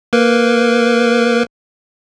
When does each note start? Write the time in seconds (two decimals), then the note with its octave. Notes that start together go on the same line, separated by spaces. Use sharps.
0.13 A#3 A#4 B4